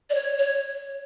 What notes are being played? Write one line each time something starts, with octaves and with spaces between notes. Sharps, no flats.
D5
C#5
C#5